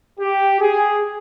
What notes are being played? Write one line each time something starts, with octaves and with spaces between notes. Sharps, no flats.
G4
G#4